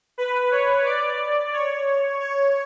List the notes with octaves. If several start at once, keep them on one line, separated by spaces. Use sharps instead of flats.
B4
C#5
D5
C#5
C#5